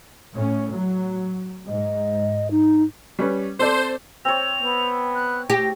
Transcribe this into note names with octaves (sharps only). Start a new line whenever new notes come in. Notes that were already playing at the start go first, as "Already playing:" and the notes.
A2 C#4
F#3
G#2 D#5
D#4
G3 C#4 B4
C4 A4 C5 D5
C4 C#5 F7
B3
F#6
G4 A#6